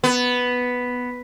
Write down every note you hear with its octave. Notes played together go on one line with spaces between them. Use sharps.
B3